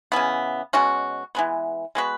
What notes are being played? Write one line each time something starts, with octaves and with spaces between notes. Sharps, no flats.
C#3 E3 B3
B2 G#3 C#4 F#4
E3 G#3 B3
G#3 B3 F#4 B4